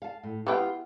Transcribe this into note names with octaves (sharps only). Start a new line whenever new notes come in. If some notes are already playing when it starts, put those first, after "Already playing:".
F5 A5
A2
E3 B3 F4 G4 G5